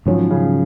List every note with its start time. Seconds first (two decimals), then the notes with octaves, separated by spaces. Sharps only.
0.06 G#2 D#3 F3 F#3 C#4
0.31 C#3